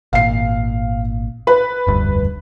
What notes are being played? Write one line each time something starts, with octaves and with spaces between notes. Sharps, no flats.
G#1 A#2 F5 C7
B4
F1 D2 G2